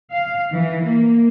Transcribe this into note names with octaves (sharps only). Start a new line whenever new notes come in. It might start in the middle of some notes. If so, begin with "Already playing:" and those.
F5
E3
A#3